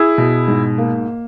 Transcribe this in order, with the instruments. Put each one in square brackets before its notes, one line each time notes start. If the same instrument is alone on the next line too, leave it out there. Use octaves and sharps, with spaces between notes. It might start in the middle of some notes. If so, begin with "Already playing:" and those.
Already playing: [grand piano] E4 [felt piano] G#4
[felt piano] B2
G#2
A#3